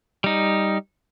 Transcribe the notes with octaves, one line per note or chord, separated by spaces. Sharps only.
G3 D#4